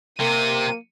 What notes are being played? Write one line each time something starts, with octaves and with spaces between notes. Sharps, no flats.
C3 A#3 D#7